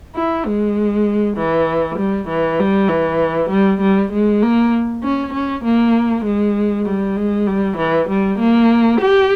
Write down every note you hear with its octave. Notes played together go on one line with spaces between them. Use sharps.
E4
G#3
E3
G3
E3
G3
E3
G3
G3
G#3
A#3
C#4
C#4
A#3
G#3
G3
G#3
G3
E3
G3
A#3
G4